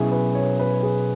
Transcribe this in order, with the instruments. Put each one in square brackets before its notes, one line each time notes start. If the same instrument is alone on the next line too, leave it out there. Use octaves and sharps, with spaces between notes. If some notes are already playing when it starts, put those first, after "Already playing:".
Already playing: [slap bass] B2 F#3 C#4 [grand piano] E4 G#4
[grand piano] B4
C#5
B4
G#4